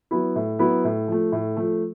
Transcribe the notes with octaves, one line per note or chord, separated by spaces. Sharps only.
F#3 B3 E4
A2
F#3 B3 E4
A2
F3 A3
A2
F3 A3